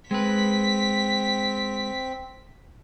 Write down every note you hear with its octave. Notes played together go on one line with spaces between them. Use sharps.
G#3 C4 B4 B6